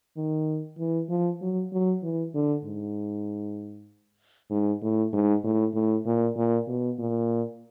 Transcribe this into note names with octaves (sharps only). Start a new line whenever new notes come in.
D#3
E3
F3
F#3
F#3
E3
D3
G#2
G#2
A2
G#2
A2
A2
A#2
A#2
B2
A#2